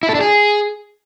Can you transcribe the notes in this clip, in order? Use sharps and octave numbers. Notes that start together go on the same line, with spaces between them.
E4
A4
D4
G#4